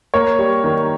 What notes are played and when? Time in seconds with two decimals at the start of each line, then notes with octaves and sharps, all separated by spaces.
0.14 A#3 C#5
0.39 G3
0.64 D#3